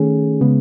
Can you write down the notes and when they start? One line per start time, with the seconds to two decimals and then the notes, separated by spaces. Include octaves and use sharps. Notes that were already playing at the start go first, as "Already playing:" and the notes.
Already playing: D#3 A3 C#4 G#4
0.41 C#3 G#3 B3